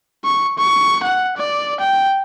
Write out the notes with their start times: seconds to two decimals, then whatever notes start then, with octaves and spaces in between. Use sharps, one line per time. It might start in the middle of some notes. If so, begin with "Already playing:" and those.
0.25 C#6
0.58 C#6
1.03 F#5
1.37 D5
1.80 G5